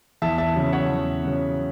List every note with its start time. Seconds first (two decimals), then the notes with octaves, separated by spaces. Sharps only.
0.22 E2 E5 A5
0.38 E5 A5
0.56 C#3 F#3
0.73 C#5 F#5
0.90 E2
1.24 C#3 F#3